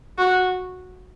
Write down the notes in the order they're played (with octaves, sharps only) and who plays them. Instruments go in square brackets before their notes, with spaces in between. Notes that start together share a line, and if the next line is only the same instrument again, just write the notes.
[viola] F#4